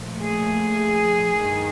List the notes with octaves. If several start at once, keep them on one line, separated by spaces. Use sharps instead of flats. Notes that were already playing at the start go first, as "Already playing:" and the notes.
Already playing: A#2 F3 A3
G#4
G2 D#3